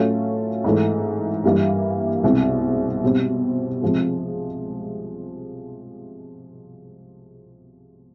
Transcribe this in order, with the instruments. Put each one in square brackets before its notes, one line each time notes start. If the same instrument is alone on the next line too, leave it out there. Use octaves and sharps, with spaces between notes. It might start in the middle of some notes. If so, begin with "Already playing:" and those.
Already playing: [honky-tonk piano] A2 F#3 A3 C#4 F4
G#2 E3 A3
G2 E3 G3 A#3
C2 B2 G#3 C4
B2 G3 C4
C3 F3 G#3